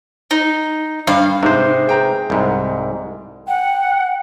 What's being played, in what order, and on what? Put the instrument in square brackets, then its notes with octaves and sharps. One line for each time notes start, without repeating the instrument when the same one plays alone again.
[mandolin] D#4
[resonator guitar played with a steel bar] G2 [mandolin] F5
[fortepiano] G#2 [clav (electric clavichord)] C3 C5
[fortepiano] G#4 G5 A#5
[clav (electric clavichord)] C2 G#2
[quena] F#5 [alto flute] G5